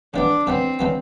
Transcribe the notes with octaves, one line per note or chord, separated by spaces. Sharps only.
C#3 E3 G3 B3 D4
C#3 E3 G3 B3 C4
C#3 E3 G3 B3